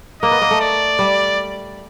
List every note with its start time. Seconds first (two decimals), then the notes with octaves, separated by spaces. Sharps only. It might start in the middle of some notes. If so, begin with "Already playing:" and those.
0.22 A#3 D#5
0.31 B3
0.42 A#3
0.51 A3
0.61 D5
0.99 G3